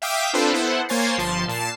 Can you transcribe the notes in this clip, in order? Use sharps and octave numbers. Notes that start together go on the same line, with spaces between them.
E5 F5 G5 D6 D#6 B6
C4 D4 F4 A4 B4 C5
B3 E4 A4 C5 F#5
A#3 C5 C#5 G#5 A6 C7
G1 F3 A5 C6
A#2 A5 C7 E7